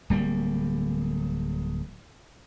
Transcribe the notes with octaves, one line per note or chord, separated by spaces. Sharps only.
D1 G3 A#3